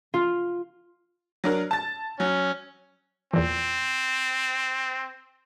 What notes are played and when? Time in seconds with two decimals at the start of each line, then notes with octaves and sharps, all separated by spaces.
0.14 F4
1.44 F#3 D4 A#4
1.71 A5 A6
2.20 F#3 C#4
3.33 E2 A#2 E3 C4